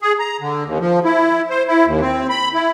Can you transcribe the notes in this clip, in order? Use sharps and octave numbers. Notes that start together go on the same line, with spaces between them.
G#4
A#5
D3
D#2
F3
E4
C5
E4
D#2
C4
B5
E4